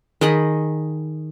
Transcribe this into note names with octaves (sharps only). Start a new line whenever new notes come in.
D#3 G#4 D#5 B5